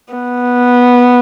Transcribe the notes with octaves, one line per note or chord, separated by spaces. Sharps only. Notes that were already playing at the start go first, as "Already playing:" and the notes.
B3